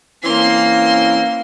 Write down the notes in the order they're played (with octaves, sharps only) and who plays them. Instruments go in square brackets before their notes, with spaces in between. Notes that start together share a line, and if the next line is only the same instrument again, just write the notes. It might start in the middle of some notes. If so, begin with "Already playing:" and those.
[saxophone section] E3 C4 C#4 [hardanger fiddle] A#3 C6